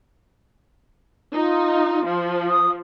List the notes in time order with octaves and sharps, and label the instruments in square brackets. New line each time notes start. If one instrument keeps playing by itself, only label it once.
[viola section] D#4 [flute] F4
[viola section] F3
[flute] D#6